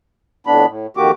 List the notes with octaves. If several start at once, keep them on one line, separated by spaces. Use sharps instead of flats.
F2 A2 B3 D4 B5
A2
F2 D#3 A#3 F#4 G4 D6